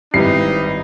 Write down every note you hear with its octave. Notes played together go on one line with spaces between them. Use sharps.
G#1 G3 D#4 E4 B4 C7